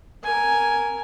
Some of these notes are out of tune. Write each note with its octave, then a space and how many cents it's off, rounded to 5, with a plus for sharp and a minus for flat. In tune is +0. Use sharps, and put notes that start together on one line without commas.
A#4 +0 G#5 +0